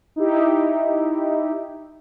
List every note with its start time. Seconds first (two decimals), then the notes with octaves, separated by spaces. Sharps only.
0.16 D#4 E4 G4